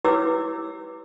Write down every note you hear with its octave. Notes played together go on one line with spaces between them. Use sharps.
E4 G4 B4 C#5 D6 E6